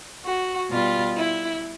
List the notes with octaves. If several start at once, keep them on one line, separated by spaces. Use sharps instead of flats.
F#4
B2 G3 F4
E4